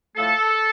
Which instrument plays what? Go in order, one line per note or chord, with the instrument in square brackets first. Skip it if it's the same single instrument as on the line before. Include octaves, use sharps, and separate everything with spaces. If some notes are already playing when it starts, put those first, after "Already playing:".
[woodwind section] A2 F3 A3 A4